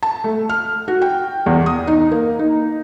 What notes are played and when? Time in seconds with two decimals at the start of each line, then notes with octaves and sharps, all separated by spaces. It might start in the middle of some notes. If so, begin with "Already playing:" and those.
0.03 A5
0.24 A3
0.49 F6
0.88 F#4
1.02 G5
1.46 E2
1.66 D#6
1.87 D#4
2.12 A#3
2.39 D#4